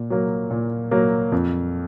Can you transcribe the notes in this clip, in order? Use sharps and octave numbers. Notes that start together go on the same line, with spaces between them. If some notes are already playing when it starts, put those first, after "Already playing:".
Already playing: A#2
F#3 A#3
A#2
F#3 A#3
F2